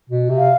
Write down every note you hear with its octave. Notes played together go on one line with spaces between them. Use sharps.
B2
C3
F5